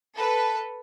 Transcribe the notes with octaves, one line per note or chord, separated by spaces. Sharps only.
A4 B4